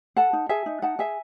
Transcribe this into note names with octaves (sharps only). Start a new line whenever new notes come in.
A4 F#5 A5
D#4
G#4 E5 G#5
D#4
D#4 F#5 A5
G#4 E5 G#5